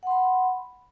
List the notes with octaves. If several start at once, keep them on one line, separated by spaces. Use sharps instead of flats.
F#5 B5 C6